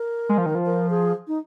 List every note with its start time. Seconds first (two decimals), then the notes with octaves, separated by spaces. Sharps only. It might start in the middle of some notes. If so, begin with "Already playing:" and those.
Already playing: A#4
0.29 G#3
0.38 F3
0.46 D#3
0.55 F3
0.66 A#4
0.90 G#4
1.28 D#4